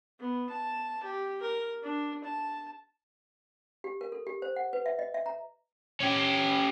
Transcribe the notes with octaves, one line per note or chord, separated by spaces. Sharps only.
B3
A5
G4
A#4
D4
A5
G4
A#4
A4
G4
C5
F#5
B4
E5
D#5
E5
A#5
C#4 G4